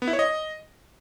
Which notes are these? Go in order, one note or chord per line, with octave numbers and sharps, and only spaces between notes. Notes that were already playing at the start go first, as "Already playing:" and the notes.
B3
E4
C#5
D#5